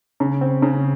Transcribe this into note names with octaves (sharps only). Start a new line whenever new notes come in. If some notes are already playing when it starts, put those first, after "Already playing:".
C#3
C4
C#3